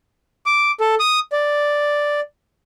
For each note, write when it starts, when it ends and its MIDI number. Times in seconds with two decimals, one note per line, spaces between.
0.46 0.71 86
0.80 0.95 69
1.00 1.20 87
1.32 2.20 74